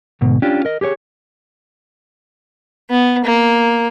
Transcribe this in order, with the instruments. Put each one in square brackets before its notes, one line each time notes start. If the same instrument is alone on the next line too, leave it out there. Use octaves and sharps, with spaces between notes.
[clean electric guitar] D2 G#2 B2
C#4 D4 F4 G4
A#4 D#5
G4 G#4 C5 C#5
[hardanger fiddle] B3
A#3